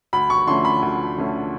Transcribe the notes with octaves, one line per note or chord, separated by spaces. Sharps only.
D2 B5
C#6
D3 F3 A3 C#4 C6
B5
D2
D3 F3 A3 C#4